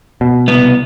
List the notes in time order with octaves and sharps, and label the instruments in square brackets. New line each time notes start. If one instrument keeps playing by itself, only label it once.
[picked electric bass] B2
[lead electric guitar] C2 B3